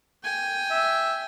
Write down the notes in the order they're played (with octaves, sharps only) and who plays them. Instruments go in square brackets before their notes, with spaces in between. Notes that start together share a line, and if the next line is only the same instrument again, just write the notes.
[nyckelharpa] G5 G#5
[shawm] E5